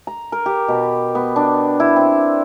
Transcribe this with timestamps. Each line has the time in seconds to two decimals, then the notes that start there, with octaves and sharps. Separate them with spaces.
0.07 A#5
0.32 A#4
0.46 G4
0.68 B2
1.15 B3
1.36 D4
1.80 E4
1.96 C4